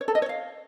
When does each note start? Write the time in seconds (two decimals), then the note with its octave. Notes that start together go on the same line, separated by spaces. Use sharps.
0.01 C#5
0.08 A4
0.15 D#5
0.22 C#5
0.29 F5